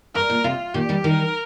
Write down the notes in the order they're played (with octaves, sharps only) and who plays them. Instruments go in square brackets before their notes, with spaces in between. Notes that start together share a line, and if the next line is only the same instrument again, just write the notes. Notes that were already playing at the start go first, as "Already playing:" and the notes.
[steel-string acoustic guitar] G2 [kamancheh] A#4
[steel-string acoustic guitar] A#2
[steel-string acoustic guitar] C3 [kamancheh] F4
[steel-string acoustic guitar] A#2 D#3 [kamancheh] G4
[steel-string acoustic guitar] D#3 G3
[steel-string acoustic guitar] D#3 G3 [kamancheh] A#4